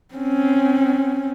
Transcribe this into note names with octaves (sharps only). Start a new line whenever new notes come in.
C4 C#4